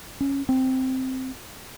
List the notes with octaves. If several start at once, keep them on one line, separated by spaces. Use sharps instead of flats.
C#4
C4